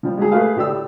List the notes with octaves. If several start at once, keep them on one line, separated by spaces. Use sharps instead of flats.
F3 G3
G#3 G4 G#4
A3 G#4 B4 F5
A2 G4 D5 E6